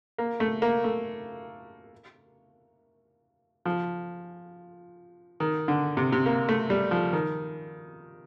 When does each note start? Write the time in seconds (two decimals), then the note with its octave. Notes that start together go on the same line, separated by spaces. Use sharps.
0.18 A#3
0.40 A3
0.62 A#3
0.84 A3
3.65 F3
5.40 D#3
5.68 D3
5.97 C3
6.12 C3
6.26 A#3
6.49 A3
6.70 G3
6.91 F3
7.13 D#3